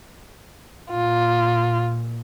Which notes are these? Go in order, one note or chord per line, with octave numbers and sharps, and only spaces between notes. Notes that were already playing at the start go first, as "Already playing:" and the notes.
A#2 F4